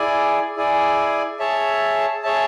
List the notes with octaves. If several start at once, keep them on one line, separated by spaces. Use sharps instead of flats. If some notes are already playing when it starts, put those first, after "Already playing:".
Already playing: E4 G#4 D5 G#5
E4 G#4 D5 G#5
G#4 C#5 E5 A5
G#4 C#5 E5 A5